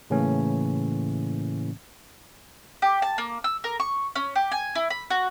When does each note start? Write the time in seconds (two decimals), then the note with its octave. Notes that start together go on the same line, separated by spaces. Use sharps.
0.10 A2 C#3 E3 A3 A#3 C#4
2.82 G4
3.02 A5
3.18 A#3
3.44 E6
3.64 A#4
3.80 C#6
4.16 C#4
4.35 G4
4.52 G#5
4.75 E4
4.90 B5
5.10 F#4